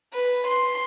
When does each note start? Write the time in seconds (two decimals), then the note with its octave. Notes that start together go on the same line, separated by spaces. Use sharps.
0.13 B4
0.47 C6